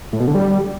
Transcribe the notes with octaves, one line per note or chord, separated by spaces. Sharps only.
A2
B2
D3
G3